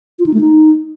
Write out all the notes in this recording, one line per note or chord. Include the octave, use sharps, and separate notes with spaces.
F4
D#4
A3
D#4